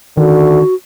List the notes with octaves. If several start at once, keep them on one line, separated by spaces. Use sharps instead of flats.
D3 D#3 F#4